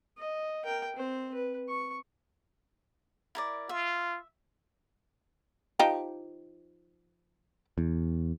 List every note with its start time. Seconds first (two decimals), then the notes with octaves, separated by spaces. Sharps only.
0.18 D#5
0.65 A#4 G5
0.96 C4 C5
1.34 B4
1.69 C#6
3.35 E4 A#4 D5
3.69 F4 E5
5.79 F3 D#4 G4
7.78 E2